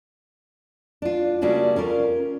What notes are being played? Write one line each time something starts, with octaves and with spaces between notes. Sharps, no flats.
D4 F4
C#3 G3 A#3 C#4 D4 F#4
C#4 F4 A#4